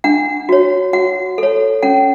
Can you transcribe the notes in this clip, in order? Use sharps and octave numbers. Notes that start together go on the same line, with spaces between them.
D4 F#5
F#4 C#5
F#4 F#5
A4 C#5
C#4 F#5